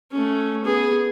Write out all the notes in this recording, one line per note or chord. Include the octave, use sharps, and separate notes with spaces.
A3 C#4
B3 G#4